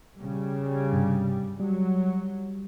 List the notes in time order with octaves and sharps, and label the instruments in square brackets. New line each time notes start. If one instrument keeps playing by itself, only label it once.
[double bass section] C#3 G3
[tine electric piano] G2 C3
[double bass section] F#3 [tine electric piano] G3